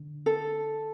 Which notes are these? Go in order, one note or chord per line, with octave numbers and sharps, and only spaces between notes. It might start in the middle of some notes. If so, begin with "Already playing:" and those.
Already playing: D3
A4